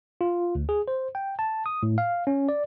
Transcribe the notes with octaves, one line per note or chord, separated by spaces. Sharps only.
F4
D2
G#4
C5
G5
A5
D#6
A2
F5
C#4
D5